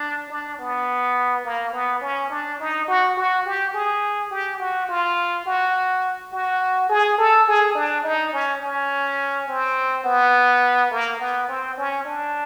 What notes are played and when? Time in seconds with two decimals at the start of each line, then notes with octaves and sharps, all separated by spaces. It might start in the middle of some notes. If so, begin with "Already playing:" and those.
Already playing: D4
0.30 D4
0.59 B3
1.45 A#3
1.73 B3
2.01 C#4
2.30 D4
2.60 D#4
2.88 F#4
3.17 F#4
3.45 G4
3.73 G#4
4.31 G4
4.59 F#4
4.89 F4
5.46 F#4
6.32 F#4
6.89 G#4
7.18 A4
7.47 G#4
7.75 D4
8.03 D#4
8.33 C#4
8.61 C#4
9.48 C4
10.04 B3
10.91 A#3
11.19 B3
11.48 C4
11.77 C#4
12.05 D4